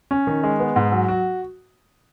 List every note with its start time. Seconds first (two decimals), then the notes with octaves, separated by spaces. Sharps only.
0.11 C#4
0.27 D#3
0.43 G#3
0.60 B3
0.76 G#2
0.92 F#3
1.08 F#4